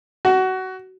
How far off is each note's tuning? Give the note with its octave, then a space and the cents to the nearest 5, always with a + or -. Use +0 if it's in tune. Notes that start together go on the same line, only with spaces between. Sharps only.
F#4 +20